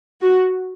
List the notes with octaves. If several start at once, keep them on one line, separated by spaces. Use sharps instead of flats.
F#4